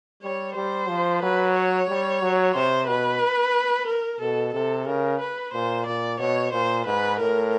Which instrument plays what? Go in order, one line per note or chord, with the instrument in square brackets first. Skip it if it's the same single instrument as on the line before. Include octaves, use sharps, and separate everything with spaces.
[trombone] G3 [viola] C#5
[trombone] G3 [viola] C5
[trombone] F3
[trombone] F#3 [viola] B4
[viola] C#5
[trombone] G3
F#3
[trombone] C3 [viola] C5
[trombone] B2 [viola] B4
[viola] A#4
[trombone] B2 [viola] A4
[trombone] C3 [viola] A4
[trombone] C#3 [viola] A#4
[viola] B4
[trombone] A#2 [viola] C5
[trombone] A#2 [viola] D5
[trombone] B2 [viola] C#5
[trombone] A#2 [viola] C5
[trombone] G#2 [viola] B4
[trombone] A2 [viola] A#4